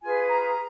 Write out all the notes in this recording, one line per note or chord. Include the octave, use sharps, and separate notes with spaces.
F4 G#4 B4 G#5
A#5